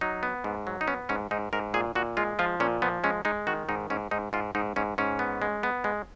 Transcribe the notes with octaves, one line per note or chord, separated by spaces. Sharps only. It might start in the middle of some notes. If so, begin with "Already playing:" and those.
F#3 D#4
B3
G#2
F#3
D#4
B3 C#4
G#2 C#4
G#2 D#4
G#2 A#4
A#2 G#4
A#2 F#4
G#3 F4
F3 F4
A#2 C#4
F3 B3
G#3 C#4
G#3 D#4
D#3 F#4
G#2 D#4
G#2 C#4
G#2 D#4
G#2 F4
G#2 D#4
G#2 C#4
G#2 C#4
B3
G#3
B3
G#3